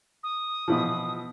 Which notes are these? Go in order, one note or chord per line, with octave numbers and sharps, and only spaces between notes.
D#6
B2 E3 F3